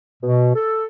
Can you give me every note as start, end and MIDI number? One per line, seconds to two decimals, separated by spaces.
0.23 0.51 47
0.55 0.85 69